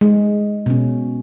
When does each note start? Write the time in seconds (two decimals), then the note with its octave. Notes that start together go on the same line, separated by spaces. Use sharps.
0.01 G#3
0.66 B2 C#4